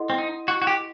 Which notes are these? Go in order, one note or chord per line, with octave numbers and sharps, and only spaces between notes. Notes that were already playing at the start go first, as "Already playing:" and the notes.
Already playing: E4 A4 D#5 F#5 C6
C4
D#4
F#4
F#4
G4